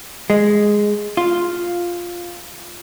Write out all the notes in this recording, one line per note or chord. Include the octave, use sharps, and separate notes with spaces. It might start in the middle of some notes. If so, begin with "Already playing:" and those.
G#3
F4